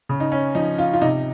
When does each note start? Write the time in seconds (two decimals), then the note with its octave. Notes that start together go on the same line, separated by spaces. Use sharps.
0.09 C#3
0.20 D#4
0.32 C#4
0.55 F3 D#4
0.78 F4
0.93 F4
1.01 C3 D#4